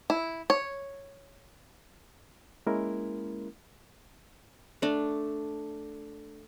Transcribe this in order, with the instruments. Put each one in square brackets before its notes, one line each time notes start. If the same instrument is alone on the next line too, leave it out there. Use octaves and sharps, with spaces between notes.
[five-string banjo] E4
C#5
[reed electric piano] G#3 A#3 C#4 E4 A#4
[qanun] A3 D4